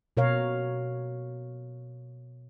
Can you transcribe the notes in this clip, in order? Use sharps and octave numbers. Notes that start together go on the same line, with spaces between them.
B2 A#4 C#5 F5